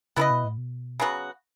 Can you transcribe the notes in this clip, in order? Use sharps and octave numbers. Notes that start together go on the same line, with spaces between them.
C#3 B3 E4 B4 D#5
B2
A2
B2
C#3 F#3 B3 F#4